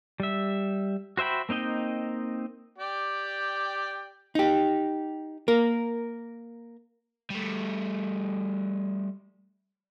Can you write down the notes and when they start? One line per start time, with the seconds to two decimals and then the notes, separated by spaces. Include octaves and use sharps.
0.20 G3 E5
1.17 F#4 C5 E5 G5 B5
1.49 A#3 C4 D#4 D#5 G5
2.78 G4 D5 G5
4.35 D#4 G4
5.48 A#3 A#4
7.30 G3 A3